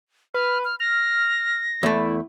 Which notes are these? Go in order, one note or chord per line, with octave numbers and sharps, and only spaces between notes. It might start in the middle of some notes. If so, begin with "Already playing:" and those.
B4 F6
F6
F6 A#6
E2 A3 E4